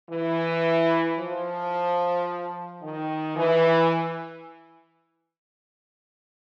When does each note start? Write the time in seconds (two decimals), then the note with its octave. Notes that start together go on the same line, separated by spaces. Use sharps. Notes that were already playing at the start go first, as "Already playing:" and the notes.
0.10 E3
1.19 F3
2.82 D#3
3.37 E3